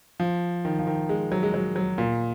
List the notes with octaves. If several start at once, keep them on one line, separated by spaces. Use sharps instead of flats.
F3
D#3
F3
D#3
G#3
F#3
G#3
F#3
F#3
A#2